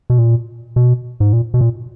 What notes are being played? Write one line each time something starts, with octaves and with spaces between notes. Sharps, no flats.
B2
A#2
B2
G#2
A#2
B2
A#2